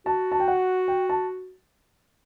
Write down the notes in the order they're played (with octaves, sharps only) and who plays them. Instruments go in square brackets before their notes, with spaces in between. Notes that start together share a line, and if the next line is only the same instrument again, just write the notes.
[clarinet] F#4 [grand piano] A5
[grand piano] A5
G5
F#5
G5
A5